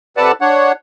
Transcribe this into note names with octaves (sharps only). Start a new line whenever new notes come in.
C3 A4 B4 D5 F#5 A5
D4 C#5 F#5